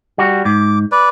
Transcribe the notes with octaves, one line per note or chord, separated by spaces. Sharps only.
G3 F#4
G#2 D6
B4 D5